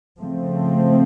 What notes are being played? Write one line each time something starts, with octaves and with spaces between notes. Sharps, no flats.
C#3 F3 A3 C4